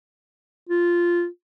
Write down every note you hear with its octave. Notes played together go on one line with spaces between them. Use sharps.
F4